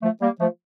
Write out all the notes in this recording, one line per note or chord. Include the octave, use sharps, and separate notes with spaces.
F3 A3
G3 A#3
F3 A3